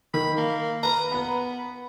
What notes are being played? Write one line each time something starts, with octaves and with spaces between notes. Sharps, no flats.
D#3 B5
A#3
B4 A#5
B3 B4 B5